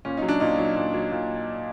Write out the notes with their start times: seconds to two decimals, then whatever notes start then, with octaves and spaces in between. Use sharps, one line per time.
0.05 A#2 C#4
0.17 F#3 D#4
0.28 D4
0.40 A#2 D#4
0.58 F#3
0.76 A#2
0.94 F#3
1.12 A#2